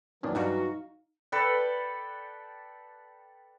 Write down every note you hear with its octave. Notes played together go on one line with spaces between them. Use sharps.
F2 A#2 D#3 E3 F#3 C#4 D#4 D5
G2 G3 D#4 F#4 F5
A4 B4 D5 G5